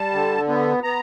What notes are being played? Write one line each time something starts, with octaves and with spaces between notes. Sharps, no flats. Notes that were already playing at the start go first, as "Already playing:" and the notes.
Already playing: G3 A5
D3
B3
B3 A#5